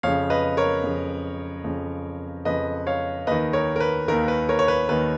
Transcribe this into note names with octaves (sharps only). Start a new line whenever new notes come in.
F2 C#3 C#5 F5
B4 D#5
A#4 C#5
F2 C#3
F2 C#3
F2 C#3 B4 D#5
C#5 F5
D#2 D#3 B4 D#5
A#4 C#5
A#4
B4
D#2 D#3 A#4
B4
A#4 C#5
C#5
B4
D#2 D#3 B4